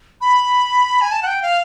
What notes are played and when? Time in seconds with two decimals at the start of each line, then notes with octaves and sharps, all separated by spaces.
0.21 B5
1.01 G#5
1.12 A5
1.23 F#5
1.27 G5
1.42 F5